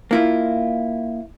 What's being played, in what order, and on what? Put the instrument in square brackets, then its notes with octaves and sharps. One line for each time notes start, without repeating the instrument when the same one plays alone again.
[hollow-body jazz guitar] A#3 E4 F4